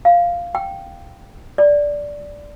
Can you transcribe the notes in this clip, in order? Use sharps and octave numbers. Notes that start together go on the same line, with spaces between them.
F5
G5
D5